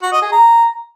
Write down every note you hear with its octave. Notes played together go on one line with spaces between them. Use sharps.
F#4
D#5
G#4
A#5